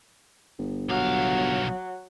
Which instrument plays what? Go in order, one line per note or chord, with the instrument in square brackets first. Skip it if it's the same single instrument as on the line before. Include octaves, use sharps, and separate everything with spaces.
[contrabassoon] G1
[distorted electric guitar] B1 F5 [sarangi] F#3